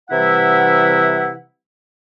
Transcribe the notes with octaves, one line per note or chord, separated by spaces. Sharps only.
C3 E3 G3 E4 E5 F#5